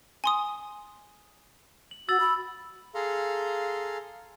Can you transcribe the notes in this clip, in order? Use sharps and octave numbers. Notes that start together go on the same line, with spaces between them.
G#5 C6 D#6
F#7
F#4 E6 A6 F#7
B5
G#4 A4 F5 A#5 C6